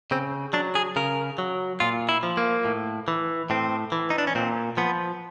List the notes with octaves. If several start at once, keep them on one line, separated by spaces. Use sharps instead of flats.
C#3 C4
F#3 D4
G#4
C#3 A#4
F#3
A#2 F4
E4
F3
A#3
A2
E3
A2 C4
E3
D#4
D4
C#4
A#2 C4
F3 B3